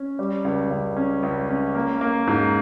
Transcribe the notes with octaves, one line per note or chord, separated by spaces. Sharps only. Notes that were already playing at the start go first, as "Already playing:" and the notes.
Already playing: C#4
G3
C#2
C#2
C#4
C#2
C#4
A#3
A#3
G#2